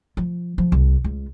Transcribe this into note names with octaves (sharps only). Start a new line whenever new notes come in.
F3
F3
C2
C#2